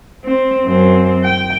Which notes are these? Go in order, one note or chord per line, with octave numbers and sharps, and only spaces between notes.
C4
F#2 C4
G5